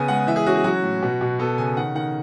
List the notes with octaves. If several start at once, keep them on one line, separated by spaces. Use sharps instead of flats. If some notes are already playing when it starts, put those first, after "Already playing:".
Already playing: C#3 B3 G#5
G#3 F#5
E3 E5
G#4
C#4 F#4
G#4
F#3 F#4
A2
B2
B2
B3 A4
C#3 G#5
D#3 F#5
D#3 F#5